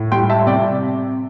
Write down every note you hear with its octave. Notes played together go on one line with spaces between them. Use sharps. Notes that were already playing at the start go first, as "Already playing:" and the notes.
Already playing: A2
G3 G5 C6
E5 A5
C3 D5 G5